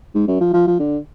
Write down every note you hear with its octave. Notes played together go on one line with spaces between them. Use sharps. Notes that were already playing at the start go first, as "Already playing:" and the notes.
G#2
F#2
F3
F3
F3
D3